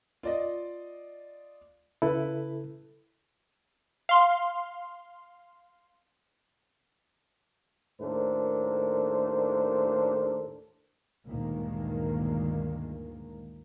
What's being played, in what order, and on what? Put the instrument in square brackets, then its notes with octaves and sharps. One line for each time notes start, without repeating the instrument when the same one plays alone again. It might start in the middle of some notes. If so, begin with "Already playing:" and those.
[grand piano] F4 D5 D#5
[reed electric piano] C#3 E4 A4 [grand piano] B4
[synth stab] F5 C6
[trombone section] D#2 A2 D4 A4 A#4 C5
[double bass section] D2 G2 A#2 D#3 G#3 A#3